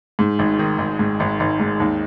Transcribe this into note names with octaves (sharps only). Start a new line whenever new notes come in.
G#2
G#1
D#3
G#1
G#2
G#1
G#1
G#2
D#2